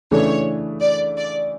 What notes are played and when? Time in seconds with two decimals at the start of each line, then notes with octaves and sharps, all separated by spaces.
0.11 C#3 E3 A3 D4 A4 C#5
0.81 D5
1.16 D5